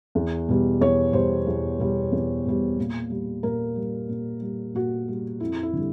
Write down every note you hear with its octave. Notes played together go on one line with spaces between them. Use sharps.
E2
B2 G3
E2 C#5
B2 G3 C5
E2
B2 G3
E2
B2 G3
A#2
G3
A#2 A#4
G3
A#2
G3
A#2 F#4
G3
F2 E4
E4
D3 G3